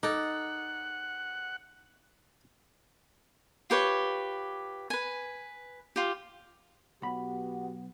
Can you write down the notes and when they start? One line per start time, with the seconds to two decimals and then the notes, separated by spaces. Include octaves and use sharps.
0.03 D#4 A4 F#5 D6
3.70 F4 G4 B4 C#5
4.90 B4 G#5
5.96 F4 G4
7.02 B1 B3 F#4 G4 F#5 B5